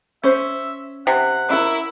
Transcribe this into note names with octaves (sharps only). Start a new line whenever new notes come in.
C#4 C5 E5
C3 F#5
C#4 E4 A#4